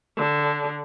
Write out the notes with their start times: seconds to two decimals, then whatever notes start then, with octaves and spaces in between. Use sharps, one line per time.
0.17 D3